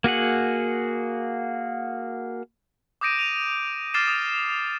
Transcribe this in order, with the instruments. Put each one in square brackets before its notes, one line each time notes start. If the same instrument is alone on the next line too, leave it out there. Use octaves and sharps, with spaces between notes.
[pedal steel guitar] A#3 F#4 G#4 F#5
[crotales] D6 D#6 G6 A#6 D7 D#7
D#7 F7
D6 F6 A6 C7 E7
D#6